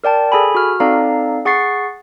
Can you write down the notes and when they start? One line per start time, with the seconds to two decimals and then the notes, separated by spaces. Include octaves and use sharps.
0.04 A#4 D5 G5 A5
0.32 G#4 A4 G#5 B5
0.55 F#4 F6
0.80 C4 D#4 A4 D5 F5 A#5
1.45 G#4 F#5 C#6 A6 C7